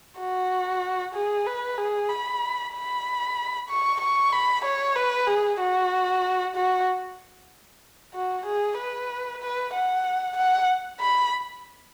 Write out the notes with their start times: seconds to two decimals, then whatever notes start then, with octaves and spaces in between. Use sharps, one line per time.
0.19 F#4
1.14 G#4
1.46 B4
1.78 G#4
2.10 B5
2.74 B5
3.69 C#6
4.00 C#6
4.32 B5
4.65 C#5
4.96 B4
5.27 G#4
5.60 F#4
6.55 F#4
8.14 F#4
8.45 G#4
8.78 B4
9.41 B4
9.74 F#5
10.37 F#5
11.00 B5